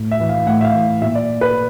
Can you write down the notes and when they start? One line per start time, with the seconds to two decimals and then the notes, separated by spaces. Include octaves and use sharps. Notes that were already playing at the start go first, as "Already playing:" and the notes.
Already playing: A2
0.11 E5
0.20 E3
0.29 F5
0.46 A2 F#5
0.61 E5
0.65 F5
0.74 E3
1.01 A#2 E5
1.15 D5
1.41 B4